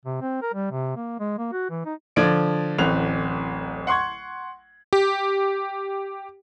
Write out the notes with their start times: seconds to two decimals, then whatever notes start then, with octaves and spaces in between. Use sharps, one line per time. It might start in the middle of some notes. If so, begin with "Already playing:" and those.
0.05 C3
0.21 C4
0.42 A#4
0.54 G3
0.71 C3
0.96 A#3
1.19 G#3
1.38 A#3
1.52 F#4
1.70 E3
1.85 D#4
2.16 D3 F3 D5 G#6 D7
2.78 D1 A1 C4 F#6 F7
3.87 F#5 C6 C#6 G#6
4.93 G4